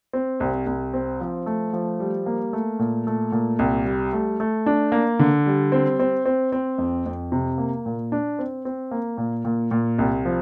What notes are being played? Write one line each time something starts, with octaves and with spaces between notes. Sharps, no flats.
C4
C2
C2
C4
F3
A3
F3
G3
A#3
A3
A#2
A3
A#2
C2
G3
A3
A3
D4
A#3
D3
G3
C4
C4
C4
C4
F2
F2
C3
A#3
A#2
D4
C4
C4
A#3
A#2
A#2
A#2
C2
F3